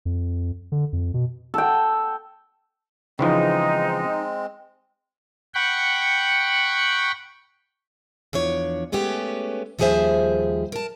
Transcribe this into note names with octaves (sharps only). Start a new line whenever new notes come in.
F2
D3
F2
B2
A4 G5
C#3 E3 F3 G#3 C4 D#4
F#5 G5 B5 C#6
E2 F3 D4 C#5
G#3 A3 B3 C#4 G4
D#2 F3 G3 G#4 C5 E5
A#4 A5